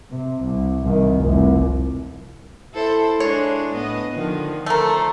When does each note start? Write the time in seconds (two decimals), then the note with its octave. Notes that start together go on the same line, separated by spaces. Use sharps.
0.11 C3
0.43 C2
0.83 C2 D#3
1.21 F1 C2
2.74 E4 A4 C5
3.20 G#3 D4 E4 C#5
3.76 A2 B3 D#5
4.13 D3 D#3 F3
4.66 A3 A4 A#4 C5